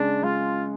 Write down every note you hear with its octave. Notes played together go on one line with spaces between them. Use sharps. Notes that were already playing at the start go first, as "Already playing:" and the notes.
Already playing: C#3 G#3 D4
G#3 F4